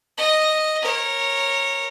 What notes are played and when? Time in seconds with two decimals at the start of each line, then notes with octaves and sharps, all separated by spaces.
0.17 D#5
0.82 A#4 C#5